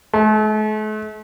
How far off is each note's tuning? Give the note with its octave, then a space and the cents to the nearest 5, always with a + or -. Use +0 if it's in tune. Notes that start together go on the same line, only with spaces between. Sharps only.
A3 -45